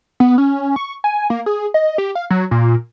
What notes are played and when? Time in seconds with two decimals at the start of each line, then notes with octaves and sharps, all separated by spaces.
0.20 B3
0.38 C#4
0.76 C#6
1.04 G#5
1.30 A#3
1.46 G#4
1.74 D#5
1.98 G4
2.15 F5
2.30 F#3
2.51 A#2